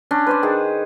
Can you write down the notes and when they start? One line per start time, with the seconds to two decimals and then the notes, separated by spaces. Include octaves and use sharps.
0.11 C#4 D4
0.27 B4 C5 D5
0.43 D#3 G#4